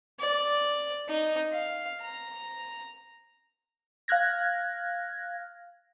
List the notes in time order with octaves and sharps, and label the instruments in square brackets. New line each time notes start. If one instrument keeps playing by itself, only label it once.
[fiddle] D5
D#4
F5
A#5
[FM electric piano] F5 F6 F#6 G#6 A#6